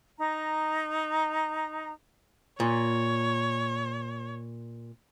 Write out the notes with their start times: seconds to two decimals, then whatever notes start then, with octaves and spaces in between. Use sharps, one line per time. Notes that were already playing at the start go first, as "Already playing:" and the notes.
0.19 D#4 A#5
2.60 A#2 C#5